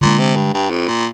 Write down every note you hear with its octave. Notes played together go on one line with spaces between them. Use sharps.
A#2 D3 F3 G#3 D4
C3
G2
G2
F2
A#2